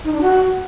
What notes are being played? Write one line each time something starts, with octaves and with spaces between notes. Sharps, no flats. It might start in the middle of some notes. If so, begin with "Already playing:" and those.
D#4
D4
F#4